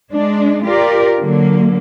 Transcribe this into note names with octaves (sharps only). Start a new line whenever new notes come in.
G#3 D4
F4 G4 A#4 D5
D3 F#3 A#3